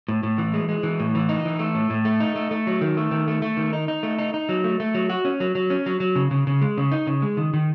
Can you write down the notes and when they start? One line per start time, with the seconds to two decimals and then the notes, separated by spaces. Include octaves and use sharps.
0.08 A2
0.23 A2
0.38 E3
0.54 G#3
0.69 G#3
0.83 E3
1.00 A2
1.15 E3
1.29 D#4
1.45 E3
1.59 A3
1.75 A2
1.90 A2
2.05 A3
2.20 D#4
2.35 A3
2.51 A3
2.67 F#3
2.81 D#3
2.97 A3
3.11 D#3
3.28 A3
3.42 A3
3.57 D#3
3.73 D#4
3.88 D#4
4.03 A3
4.18 D#4
4.34 D#4
4.49 F#3
4.64 A3
4.80 A3
4.95 F#3
5.10 F#4
5.25 C#4
5.40 F#3
5.55 F#3
5.70 C#4
5.86 F#3
6.00 F#3
6.15 C#3
6.31 C#3
6.47 C#3
6.62 G#3
6.78 C#3
6.92 D#4
7.07 C#3
7.22 G#3
7.37 D#3
7.54 D#3